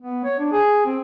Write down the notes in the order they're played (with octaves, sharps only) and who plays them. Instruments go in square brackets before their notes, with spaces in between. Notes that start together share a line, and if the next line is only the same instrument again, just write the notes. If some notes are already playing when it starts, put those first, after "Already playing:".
[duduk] B3
C#5
D4
G#4
C4